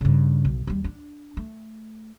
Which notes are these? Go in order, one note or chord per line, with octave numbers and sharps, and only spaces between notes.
G2 C#3
B1
D#2 G3
D4
A3